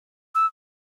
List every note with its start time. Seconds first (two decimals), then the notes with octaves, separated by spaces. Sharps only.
0.35 E6